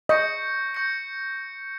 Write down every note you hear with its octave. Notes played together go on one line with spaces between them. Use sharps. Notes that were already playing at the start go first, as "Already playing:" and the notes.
D#5 C#6 G6 A#6 C#7
C#6 G6 A#6 C#7